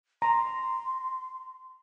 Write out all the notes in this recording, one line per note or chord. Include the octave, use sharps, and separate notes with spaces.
A#5 C6